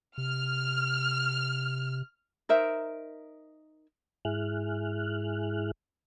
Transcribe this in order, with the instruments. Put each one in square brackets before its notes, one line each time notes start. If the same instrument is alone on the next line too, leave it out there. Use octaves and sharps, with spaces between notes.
[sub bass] C3 [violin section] F6
[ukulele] D#4 A#4 C5 E5
[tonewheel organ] G#2 E4 G#4 F6 F#6